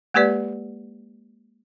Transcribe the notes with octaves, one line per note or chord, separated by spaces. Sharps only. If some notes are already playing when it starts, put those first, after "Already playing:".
G#3 A#3 G4 B4 D5